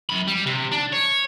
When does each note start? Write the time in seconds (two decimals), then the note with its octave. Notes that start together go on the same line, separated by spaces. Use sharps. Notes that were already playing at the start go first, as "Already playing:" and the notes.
0.10 F#2 B5
0.28 G3
0.47 C3
0.72 D4
0.93 C#5